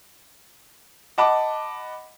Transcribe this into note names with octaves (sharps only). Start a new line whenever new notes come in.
D#5 F#5 A5 B5 D6